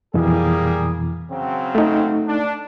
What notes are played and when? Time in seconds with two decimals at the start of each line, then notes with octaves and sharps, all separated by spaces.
0.14 F2 B2 E3 G3 A#3 G#4
1.31 C#3 F#3 C4
1.75 A3 D#4
2.26 D4